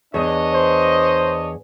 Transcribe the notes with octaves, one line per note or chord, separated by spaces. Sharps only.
E2 D4 C#5 D#5
C5